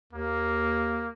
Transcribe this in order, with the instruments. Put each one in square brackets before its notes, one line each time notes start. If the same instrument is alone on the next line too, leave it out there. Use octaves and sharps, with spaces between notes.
[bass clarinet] D#2 [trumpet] A#3